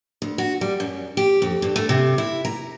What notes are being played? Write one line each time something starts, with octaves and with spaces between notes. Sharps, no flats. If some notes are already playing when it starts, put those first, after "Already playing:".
D2
F#4
G3
F#2
G4
F2
G2
A3
C3
E4
A#5